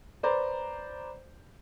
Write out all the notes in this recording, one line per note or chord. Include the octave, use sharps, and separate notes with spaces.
B4 C5 D5 A#5